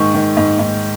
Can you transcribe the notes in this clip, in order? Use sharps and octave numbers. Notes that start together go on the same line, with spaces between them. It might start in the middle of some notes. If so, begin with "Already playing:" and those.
Already playing: G#2 D#3 C#6
D#3
G#2
G#2